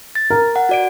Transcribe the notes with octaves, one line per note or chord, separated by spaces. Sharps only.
A6
A#4
F#5
F#4 D5 D7